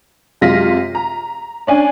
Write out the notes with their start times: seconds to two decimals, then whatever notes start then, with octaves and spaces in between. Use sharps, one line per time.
0.41 F#2 C3 G#3 F4 A#6 B6
0.95 A#5
1.67 C#4 D4 G#5